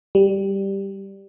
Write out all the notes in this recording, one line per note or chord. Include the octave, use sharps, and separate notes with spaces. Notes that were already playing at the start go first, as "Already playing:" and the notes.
G3